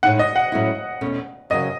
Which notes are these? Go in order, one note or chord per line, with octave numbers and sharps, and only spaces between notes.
A2 G#3 D#4 F#5
D#5
F#5
A2 F#3 A3 C#4 E4
E2 B2 A3 C#4
F#2 C#3 F#3 D#5